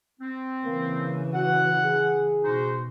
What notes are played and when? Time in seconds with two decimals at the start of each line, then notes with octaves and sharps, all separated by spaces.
0.20 C4
0.65 C#3 E3 A#3
1.34 F#4 F#5
1.84 G#4
2.43 B2 D#4 F#4 C5